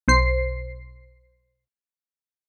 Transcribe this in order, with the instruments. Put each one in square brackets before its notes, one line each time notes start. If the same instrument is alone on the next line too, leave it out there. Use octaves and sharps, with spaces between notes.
[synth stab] B1 C5 C7